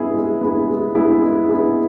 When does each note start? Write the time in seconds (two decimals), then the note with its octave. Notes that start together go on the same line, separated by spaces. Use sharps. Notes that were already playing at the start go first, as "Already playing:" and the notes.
Already playing: G#3 B3 E4 G#4
0.14 G#3
0.41 B3 E4 G#4
0.68 G#3
0.95 B3 E4 G#4
1.22 G#3
1.49 B3 E4 G#4